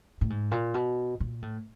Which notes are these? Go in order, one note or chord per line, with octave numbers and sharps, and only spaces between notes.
A2
G#2
A#2
B2
A#2
A2